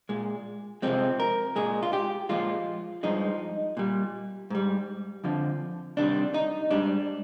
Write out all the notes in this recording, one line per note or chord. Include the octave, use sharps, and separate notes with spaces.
A#2 G#3
F2 C3 F3 G#3 C4
A#4
A#2 G#3 G#4
F4
G4
A#2 F3 G#3 F4
G2 F3 G#3 D#4
A#2 G3
G#2 G3
F2 D3 F3
C3 D#3 G3 D4
D#4
G#2 G3 D4